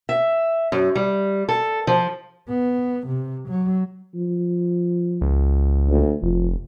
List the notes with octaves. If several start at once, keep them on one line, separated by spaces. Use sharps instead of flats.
E5
F#2
G3
A4
F3
B3
C3
F#3
F3
C#2
D2
F1 F3